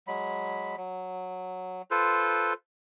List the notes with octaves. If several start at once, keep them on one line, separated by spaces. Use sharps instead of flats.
F#3 G#3 B5
F#3
F4 A4 B4 C5